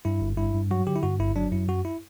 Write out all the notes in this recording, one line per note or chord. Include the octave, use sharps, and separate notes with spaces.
G2 E4
G1
G2 E4
G2
F#3 F#4
D3 G4
E4
G2 F#4
G1 E4
F#3 D4
F#2 E4
F#2 F#4
E4